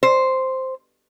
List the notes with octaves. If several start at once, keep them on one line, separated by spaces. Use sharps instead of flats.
C5